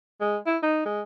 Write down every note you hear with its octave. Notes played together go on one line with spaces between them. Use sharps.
G#3
E4
D#4
G#3